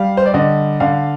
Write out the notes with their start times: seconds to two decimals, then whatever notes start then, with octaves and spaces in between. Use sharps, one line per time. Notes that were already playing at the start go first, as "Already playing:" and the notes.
Already playing: G3 F5
0.17 C5
0.26 D5
0.34 D3 D#5
0.80 D3 F5